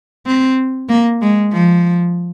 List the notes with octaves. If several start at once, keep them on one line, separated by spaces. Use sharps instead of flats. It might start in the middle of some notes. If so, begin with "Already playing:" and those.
C4
A#3
G#3
F3